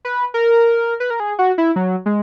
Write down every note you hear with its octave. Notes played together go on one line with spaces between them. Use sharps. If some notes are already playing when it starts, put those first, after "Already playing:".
B4
A#4
B4
A#4
G#4
F#4
E4
F#3
G#3